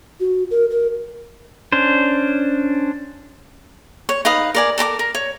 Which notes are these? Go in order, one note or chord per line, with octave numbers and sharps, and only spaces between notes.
F#4
A#4
A#4
C#4 D4 C5
C#5
D#4 B4 F5 D#6
A#4 D5 G#5
A4 A#4 A5 D6
A#4
C#5